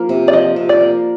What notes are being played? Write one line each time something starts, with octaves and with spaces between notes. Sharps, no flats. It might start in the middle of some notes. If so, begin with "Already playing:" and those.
Already playing: F3 A#3
C3
D5
F3 D#5
C3
D5
A#3